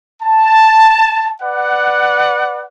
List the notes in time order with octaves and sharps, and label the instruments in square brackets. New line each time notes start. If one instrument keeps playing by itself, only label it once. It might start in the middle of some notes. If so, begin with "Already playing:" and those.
[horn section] A5
B4 D5 F#5